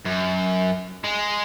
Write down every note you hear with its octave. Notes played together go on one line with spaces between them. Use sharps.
F#2
G#3